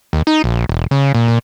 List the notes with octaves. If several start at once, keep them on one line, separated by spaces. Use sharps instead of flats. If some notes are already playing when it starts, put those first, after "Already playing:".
D#2
D#4
A#1
E1
C#3
A#2
A#2